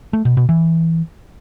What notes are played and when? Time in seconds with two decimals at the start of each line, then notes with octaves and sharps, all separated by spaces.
0.13 A3
0.25 B2
0.37 B2
0.49 E3